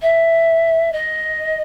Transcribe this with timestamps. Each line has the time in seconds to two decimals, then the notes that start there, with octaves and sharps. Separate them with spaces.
0.02 E5
0.93 D#5